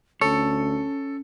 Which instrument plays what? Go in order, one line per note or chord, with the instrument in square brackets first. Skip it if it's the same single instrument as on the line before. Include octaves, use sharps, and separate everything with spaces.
[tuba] D2 [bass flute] C#4 [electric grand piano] A4 [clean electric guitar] C#5